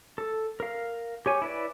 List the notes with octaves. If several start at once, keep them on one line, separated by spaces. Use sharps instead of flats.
A4
A#4 F5
G4 C#5 G#5
E4 B4 D5